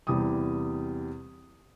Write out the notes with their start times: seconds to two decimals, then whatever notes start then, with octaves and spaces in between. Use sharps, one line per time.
0.07 E2 C3 G3 G4 D#6